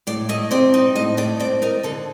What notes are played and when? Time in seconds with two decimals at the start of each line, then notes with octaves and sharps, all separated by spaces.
0.07 A2 D5
0.29 A3 D#5
0.51 C4 D5
0.74 D#4 D#5
0.96 A2 D#5
1.17 A3 D5
1.40 C4 D5
1.62 D#4 A#4
1.83 D3 A4